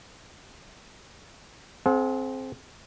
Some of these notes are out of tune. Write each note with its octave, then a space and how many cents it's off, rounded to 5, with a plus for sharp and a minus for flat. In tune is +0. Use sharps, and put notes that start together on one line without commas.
C4 +0 G#4 +45 F#5 -40